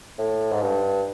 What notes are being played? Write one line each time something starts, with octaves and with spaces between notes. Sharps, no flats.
A2
G#2
G2